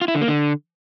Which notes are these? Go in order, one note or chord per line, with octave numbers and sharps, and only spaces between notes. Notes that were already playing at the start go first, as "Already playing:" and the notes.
F4
E4
D3
A#3
D3